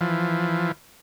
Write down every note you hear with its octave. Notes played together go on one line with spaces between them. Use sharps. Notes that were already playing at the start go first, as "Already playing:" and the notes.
E3 F3